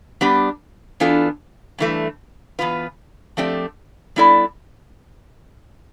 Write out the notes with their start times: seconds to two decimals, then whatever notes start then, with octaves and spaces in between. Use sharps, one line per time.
0.21 G3 B3 D4 G4 D5
1.00 E3 B3 D4 F4 A4
1.79 G2 E3 A3
2.59 E2 B2 B3 F4 B4
3.37 F3 A3 C4 G4 D5
4.16 G3 B3 E4 A4 D5